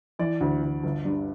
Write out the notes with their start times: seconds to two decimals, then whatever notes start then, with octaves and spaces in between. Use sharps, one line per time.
0.19 E3 D5
0.41 D2
0.62 D2
0.83 G1
1.05 G2